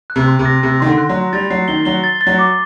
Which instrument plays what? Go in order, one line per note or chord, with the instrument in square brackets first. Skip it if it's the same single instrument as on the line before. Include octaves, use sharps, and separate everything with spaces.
[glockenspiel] F#6
[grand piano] C3
[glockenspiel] C6
[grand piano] C3
[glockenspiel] A#6
[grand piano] C3 [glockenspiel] A#6
[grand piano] D#3 [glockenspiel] C6
[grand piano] D3
[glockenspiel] F#6
[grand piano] F#3
[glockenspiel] C6
[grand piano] G3 [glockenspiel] A6
[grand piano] F#3 [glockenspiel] C7
[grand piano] D#3 [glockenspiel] G7
[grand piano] F#3 [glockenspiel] G7
[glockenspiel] A6
A6
[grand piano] F#3
[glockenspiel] D6